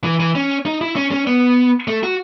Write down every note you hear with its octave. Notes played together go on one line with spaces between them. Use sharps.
E3
E3
C#4
D#4
E4
C#4
C#4
B3
A3
F#4